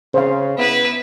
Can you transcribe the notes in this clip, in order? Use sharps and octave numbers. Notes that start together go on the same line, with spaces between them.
C#3 C5 F5
B3 E4 B4